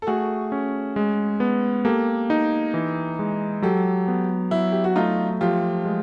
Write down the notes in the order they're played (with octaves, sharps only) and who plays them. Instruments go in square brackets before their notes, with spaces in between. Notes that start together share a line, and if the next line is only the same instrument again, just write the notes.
[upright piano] A4
[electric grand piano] A3 [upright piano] F#4 G#4
[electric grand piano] C#4
G#3
B3
[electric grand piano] A#3 [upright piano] G4 A4
[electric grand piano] D#4
E3
G#3
[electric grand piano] F#3 [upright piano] G4 A4
[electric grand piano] B3
[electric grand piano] F#3 [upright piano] E4
[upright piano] G4
F#4
[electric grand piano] A3 [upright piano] D#4 F4
[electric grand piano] F3 [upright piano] F4 G4
[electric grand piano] G#3